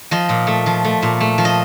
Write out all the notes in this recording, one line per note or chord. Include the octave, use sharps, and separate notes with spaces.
F3 D#5
A#2
A3
F3
A3
A#2
A3
F3
D#5